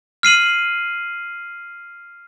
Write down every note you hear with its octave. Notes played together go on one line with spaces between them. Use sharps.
F6 C7 D#7 F#7